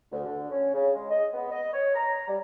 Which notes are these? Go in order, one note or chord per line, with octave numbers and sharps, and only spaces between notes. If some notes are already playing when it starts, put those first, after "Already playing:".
D2
D3
C#4
C#3
G#3
D#5
B3
D#5
C#5
A#5
G3